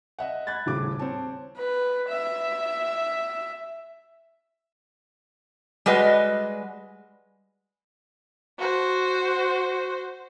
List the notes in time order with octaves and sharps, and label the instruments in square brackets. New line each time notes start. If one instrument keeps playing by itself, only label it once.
[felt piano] D#5 E5 F#5
B5 F#6 G#6 A6
D#1 A2 C#3 D6
C4 C#5 A5
[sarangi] B4
E5
[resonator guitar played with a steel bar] G3 G#3 F#4 B4 D#5
[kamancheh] F#4 C5